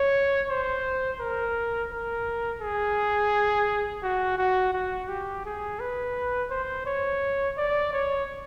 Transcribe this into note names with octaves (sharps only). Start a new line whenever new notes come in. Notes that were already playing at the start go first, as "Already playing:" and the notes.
Already playing: C#5
C5
A#4
A#4
G#4
F#4
F#4
F#4
G4
G#4
B4
C5
C#5
D5
C#5